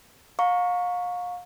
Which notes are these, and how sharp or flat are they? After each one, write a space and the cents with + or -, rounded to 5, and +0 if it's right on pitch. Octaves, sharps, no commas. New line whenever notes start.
F5 +35 A#5 +0 C#6 +0